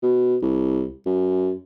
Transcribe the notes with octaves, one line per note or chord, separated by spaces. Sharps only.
B2
C2
F#2